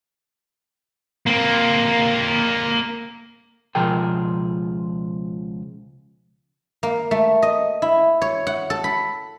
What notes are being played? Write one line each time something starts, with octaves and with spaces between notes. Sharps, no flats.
A#3 C4
C#2 B2 F3 G#4 A#4 G5
A#3
A3
D#5
E4
C#5
F#5
A4
B5